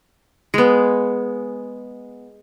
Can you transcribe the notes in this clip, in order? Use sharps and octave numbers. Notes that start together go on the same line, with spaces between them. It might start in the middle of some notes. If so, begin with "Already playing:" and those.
G#3 B3